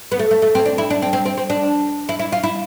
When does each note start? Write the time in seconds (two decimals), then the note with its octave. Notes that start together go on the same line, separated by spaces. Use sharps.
0.12 B3
0.19 A3
0.31 A3
0.42 A3
0.55 C4
0.66 D4
0.78 E4
0.90 D4
1.02 C4
1.13 C4
1.25 C4
1.37 C4
1.50 D4
2.09 E4
2.19 E4
2.32 F4
2.43 E4